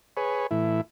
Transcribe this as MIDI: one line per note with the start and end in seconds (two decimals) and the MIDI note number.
0.17 0.47 68
0.17 0.47 71
0.17 0.47 73
0.51 0.81 45
0.51 0.81 52
0.51 0.81 64